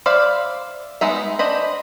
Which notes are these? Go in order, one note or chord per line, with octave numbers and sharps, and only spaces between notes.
C5 D5 E5 F5 B5
G#3 B3 D#4 E5
D4 C5 D#5 B5